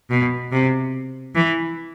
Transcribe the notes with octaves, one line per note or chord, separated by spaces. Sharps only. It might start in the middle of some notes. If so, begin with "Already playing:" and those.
B2
C3
E3